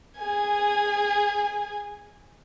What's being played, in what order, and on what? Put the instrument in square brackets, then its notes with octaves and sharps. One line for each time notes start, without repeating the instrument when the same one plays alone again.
[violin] G#4 G#5